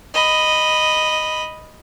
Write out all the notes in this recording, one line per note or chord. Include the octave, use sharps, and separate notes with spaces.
D#5 B5